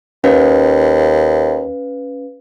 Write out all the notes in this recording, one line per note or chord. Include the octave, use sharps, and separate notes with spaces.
D#2 C#4 B4 F5